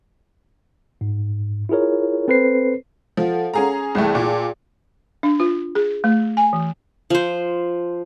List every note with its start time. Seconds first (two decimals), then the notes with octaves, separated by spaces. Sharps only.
1.01 G#2
1.69 E4 F4 G#4 A#4 C#5
2.28 C4 A4 B4 C5 C7
3.17 F3 A4 F5 F#5
3.54 C#4 G#4 A#5
3.95 C2 E3 A3 G#4 G5 A5
4.15 A#2
5.23 D4
5.40 F4
5.75 G#4
6.04 A3
6.37 G#5
6.53 E3
7.10 F3 C5